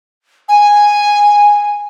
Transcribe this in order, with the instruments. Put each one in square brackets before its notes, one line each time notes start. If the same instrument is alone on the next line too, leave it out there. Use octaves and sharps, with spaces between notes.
[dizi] G#5